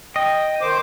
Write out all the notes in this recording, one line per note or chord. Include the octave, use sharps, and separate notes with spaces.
D#5 G5
D#3 C5 D6